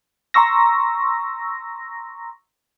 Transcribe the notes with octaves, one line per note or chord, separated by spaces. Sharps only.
A#5 C6 C#6 E6 A#6